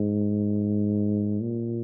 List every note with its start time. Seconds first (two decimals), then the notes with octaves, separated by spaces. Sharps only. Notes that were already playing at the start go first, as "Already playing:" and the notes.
Already playing: G#2
1.41 A#2